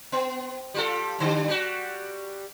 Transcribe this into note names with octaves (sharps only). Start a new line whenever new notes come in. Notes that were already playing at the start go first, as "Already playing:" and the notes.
B3
G3 F4 A4
G2 D3 G3
G3 F#4